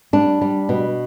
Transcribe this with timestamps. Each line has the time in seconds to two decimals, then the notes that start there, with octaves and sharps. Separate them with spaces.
0.13 G3 D4
0.41 G3
0.69 B2